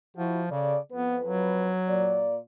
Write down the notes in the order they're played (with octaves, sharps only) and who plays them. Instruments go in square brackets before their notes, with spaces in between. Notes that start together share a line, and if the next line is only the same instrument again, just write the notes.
[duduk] F3 [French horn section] E4 F#4
[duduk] C#3 [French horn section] G#4 A4 D5
[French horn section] F2 B4 [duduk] B3
[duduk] F#3
[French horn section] A#2 D5